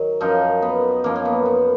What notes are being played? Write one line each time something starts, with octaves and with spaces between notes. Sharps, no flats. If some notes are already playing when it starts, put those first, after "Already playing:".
Already playing: D#3 F#3
F#2 F3 D#4
B3
F#2 F3 A#3
A#3
B3
B3